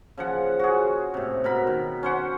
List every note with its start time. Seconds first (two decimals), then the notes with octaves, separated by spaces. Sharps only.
0.17 C#3 F3 F#5
0.59 F#4 G#4
1.14 A2 C3
1.44 B2 A#4 B5
1.67 D#3
2.03 C#4 C5 F#5